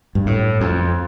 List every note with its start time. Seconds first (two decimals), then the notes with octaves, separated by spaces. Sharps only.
0.15 G2
0.26 A2
0.61 F2